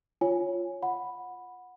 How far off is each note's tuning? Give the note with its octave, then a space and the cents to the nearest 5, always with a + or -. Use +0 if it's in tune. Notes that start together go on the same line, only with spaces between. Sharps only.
F4 +0 C#5 +0 G#5 +0
F#5 -15 B5 +0